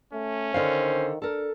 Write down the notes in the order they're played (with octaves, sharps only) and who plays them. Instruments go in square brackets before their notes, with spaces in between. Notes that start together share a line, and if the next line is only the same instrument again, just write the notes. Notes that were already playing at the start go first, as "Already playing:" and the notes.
[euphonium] A3 [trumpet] C#4
[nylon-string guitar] D3 D5 F5 [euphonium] D#3 [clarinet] C5
[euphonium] D4 [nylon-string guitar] A4 A#4